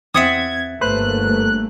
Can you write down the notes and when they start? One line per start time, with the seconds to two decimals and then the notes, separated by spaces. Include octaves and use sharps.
0.14 E2 C4 E5 F#5 D#6 G#6 A6
0.81 G1 A3 A#3 B4 C5 F#6